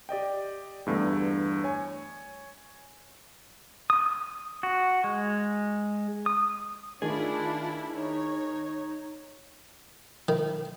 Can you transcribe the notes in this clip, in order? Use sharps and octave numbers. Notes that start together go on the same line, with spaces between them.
G4 D5 D#5 G5
E2 G2 D3 A3
C#5 G#5
D#6
F#4
G#3
D#6
D#3 A3 D4 E4 F4 G#4
D#4 C#5
D#3